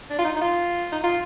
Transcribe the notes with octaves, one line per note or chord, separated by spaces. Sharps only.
D4
F4
D#4
D#4
F4
D#4
F4